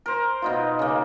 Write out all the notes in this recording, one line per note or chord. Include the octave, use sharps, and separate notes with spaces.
A#4 C5
B2 D#4 F4
C#3 A#3